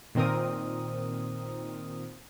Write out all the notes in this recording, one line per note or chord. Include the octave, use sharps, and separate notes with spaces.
A#2 D#3 C4 A#4 D#6